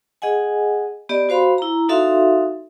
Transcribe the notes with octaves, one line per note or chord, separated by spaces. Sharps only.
G#4 D#5 F#5 G#5
B3 G4 D5 D#5
F#4 C5 F5 B5 C6
E4 A#5
D#4 F#4 A4 E5 F5 C6